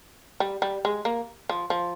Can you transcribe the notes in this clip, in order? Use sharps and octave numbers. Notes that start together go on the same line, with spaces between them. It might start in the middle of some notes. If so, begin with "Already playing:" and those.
G3
G3
G#3
A#3
F3
F3